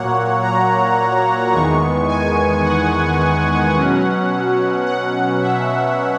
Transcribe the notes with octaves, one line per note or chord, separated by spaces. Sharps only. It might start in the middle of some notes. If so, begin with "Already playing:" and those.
Already playing: A#2 F#3 A#3 C#5 F#5
A#5
E2 D#3 G#3 B3 C#6
G#5
F#5
B2 F#3 C#4
F#5
E5